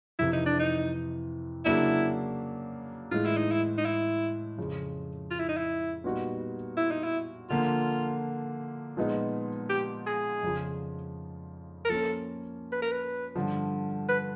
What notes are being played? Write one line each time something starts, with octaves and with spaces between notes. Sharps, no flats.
F2 C3 E3 E4
D#4
D4
D#4
C#3 F#3 A#3 D4 E4
A2 E3 G#3 F4
E4
D#4
E4
D#4
E4
F2 C#3 F3
F4
E4
D#4
E4
A#2 G3 B3 D#4 F#4
E4
D#4
E4
D3 F3 A#3 F4
A#2 F3 G#3 B3 D#4
G4
G#4
F2 C#3 F3
A#4
F3 A#3 C#4 A4
B4
A#4
B4
G2 D3 F3
B4